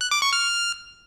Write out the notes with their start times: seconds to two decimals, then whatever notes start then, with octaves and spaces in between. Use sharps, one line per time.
0.01 F#6
0.11 D6
0.22 C#6
0.33 F6